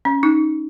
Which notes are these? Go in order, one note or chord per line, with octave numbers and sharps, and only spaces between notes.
C#4
D#4